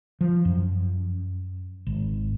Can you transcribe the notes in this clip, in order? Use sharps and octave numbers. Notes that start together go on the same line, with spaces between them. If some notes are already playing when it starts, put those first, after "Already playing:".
F3
F#2
G#1